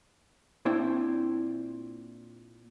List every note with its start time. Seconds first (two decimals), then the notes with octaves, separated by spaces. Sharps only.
0.65 A#2 C4 D4 E4 C5 G5